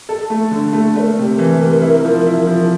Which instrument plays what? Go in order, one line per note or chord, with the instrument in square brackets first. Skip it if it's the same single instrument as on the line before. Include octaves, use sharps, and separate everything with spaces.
[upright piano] A4
A3
D3
A3
[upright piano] A3 [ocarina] D5
[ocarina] A#4
[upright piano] C3
E3
C3
E4
F3
E4
F3